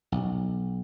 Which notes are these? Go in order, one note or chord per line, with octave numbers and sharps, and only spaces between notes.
B1